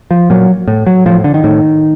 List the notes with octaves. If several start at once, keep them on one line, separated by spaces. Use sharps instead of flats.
F3
A#2 F#3
A2
F#3
A2 F3
D3
D#3
A2